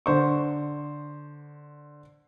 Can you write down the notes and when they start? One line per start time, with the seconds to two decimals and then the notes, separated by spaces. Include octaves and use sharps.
0.06 D3 C5 C#6